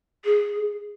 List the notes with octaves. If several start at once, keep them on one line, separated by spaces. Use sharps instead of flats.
G#4